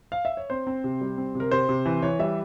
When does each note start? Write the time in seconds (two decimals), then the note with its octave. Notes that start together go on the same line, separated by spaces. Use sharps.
0.12 F5
0.25 E5
0.37 C#5
0.50 C4 C5
0.67 C4
0.84 C3
1.01 G3
1.17 C4
1.35 C3
1.40 A#4
1.51 C3 C5
1.69 C3
1.86 E3
2.02 E3 C#5
2.19 G3 E5